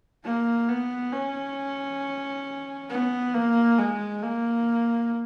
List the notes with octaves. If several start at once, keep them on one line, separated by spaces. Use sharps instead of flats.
A#3
B3
C#4
B3
A#3
G#3
A#3